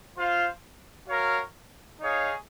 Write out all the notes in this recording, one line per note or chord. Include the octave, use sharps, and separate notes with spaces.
F4 C5 F5
F#4 A#4 C#5 F5
D#4 G#4 C#5 F5